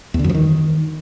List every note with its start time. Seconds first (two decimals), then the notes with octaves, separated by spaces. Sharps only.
0.14 E2
0.19 D3
0.24 F#2
0.29 F3
0.34 D#3